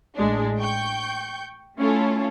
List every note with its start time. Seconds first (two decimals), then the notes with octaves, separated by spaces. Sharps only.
0.16 A1 G#3 D4
0.58 G5 C#6 G6
1.79 A3 C#4 E4 F4 A4